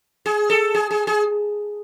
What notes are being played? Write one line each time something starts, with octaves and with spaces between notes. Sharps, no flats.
G#4
A4
G#4
G#4
G#4